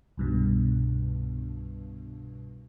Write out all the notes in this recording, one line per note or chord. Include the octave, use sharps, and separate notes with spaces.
C2 G2 B2